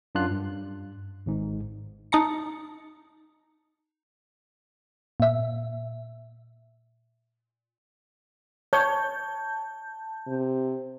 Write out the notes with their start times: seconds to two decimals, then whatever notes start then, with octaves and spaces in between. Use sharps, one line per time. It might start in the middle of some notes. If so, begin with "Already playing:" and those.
0.15 F#2 D4 F4 F#6
0.31 G2
1.26 G#1 G#2
2.12 D#4 A5 A#5 C#7
5.20 A#2 E5
8.73 C#5 A5 G6
10.27 C3